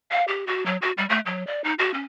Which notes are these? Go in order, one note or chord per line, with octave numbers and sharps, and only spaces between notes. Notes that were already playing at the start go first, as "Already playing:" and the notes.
F5
G4
F#4
F#3
F#4
G3
A3
F#3
D5
D#4
F#4
C#4